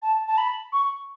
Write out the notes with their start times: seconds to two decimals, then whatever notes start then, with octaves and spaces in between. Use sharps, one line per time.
0.02 A5
0.28 A5
0.38 B5
0.73 C#6